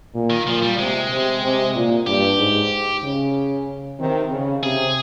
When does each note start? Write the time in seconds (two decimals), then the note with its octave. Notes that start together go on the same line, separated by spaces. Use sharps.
0.14 A#2
0.30 D#3
0.47 A#2 F3
0.62 G3
0.78 C3 G#3
1.11 C3
1.43 C3
1.75 A#2
2.07 G2 G4
2.39 G#2
3.03 C#3
3.99 C3 D#3
4.31 C#3
4.63 C3 G#4